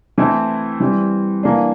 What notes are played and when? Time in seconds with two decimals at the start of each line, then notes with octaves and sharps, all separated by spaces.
0.18 E3 A3 C4 E4
0.80 E3 G3 C4
1.43 E3 A#3 D4